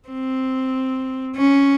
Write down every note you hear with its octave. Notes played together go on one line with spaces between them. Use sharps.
C4
C#4